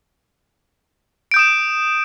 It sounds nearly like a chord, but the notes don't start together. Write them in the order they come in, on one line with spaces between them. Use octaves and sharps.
D7 G6 D#6 E7